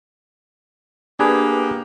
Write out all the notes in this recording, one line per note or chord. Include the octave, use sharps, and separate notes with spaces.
A#3 B3 D4 G4 G#4 B4